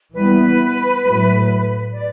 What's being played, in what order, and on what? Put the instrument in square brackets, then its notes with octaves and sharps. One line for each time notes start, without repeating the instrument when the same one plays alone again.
[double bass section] E3 G3 B3 [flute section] B4
[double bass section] A2 F#3 A3
[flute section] D5